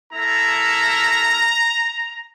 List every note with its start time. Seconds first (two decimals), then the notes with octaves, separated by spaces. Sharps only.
0.13 A#3 E4 A4 A#5